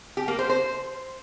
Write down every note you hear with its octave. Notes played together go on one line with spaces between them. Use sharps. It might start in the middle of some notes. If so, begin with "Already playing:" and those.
G4
A#3
C5
C5